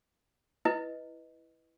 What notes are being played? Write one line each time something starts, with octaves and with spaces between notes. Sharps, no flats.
E4 B4 D#5